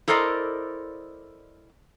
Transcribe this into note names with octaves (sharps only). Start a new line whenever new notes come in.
E4 A4 A#4 C5 D5 D#5